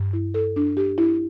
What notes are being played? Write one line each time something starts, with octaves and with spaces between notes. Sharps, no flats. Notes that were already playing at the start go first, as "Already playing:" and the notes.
Already playing: G2
E4
A4
D4
G4
E4